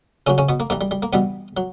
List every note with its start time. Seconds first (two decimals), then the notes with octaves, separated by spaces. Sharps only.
0.27 A#2 C#3 F#3 C#4
0.38 C#3 C#4
0.49 B2 B3
0.60 A#3
0.70 G2 E3 G3 A#3
0.81 G3
0.91 G3
1.03 A#3
1.13 G2 B2 E3 G3 B3
1.57 F#3